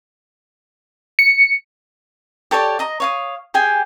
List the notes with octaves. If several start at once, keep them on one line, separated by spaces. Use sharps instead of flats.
C#7
G4 A4 C#5 D5
D#5 A#5
C#5 F5 D#6
G4 G#4 G5 G#5